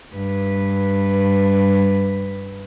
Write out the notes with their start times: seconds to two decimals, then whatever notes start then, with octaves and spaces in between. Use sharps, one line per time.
0.14 G2 B4